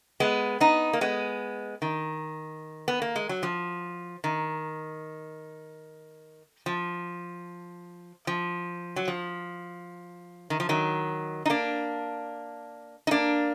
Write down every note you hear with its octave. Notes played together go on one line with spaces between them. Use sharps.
G#3 B3
B3 D#4
A#3
G#3 B3
D#3
B3
A#3
G#3
F#3
F3
D#3
F3
F3
F#3
F3
D#3
F3
D#3 F#3
D#4
A#3 D4
D#4
A#3 D4